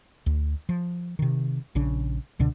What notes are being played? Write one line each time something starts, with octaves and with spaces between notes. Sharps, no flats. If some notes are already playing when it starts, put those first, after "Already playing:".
D2
F3
C3 D#3
A#1 C#3 D4
C#2 B2 D3 D4